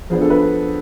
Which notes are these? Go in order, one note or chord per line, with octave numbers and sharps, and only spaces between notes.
F3 B3 D4 G#4
A4
B4